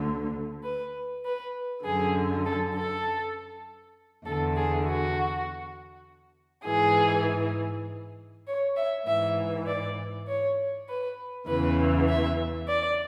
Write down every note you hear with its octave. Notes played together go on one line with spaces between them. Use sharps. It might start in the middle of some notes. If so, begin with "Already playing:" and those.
Already playing: D2 D3
B4
B4
F#2 D3 G#4
A4
A4
E2 D3 A4
G#4
F#4
G#2 E3 G#4
C#5
E5
G#2 E3 E5
D5
C#5
B4
E2 C#3 E3 B4
E5
D5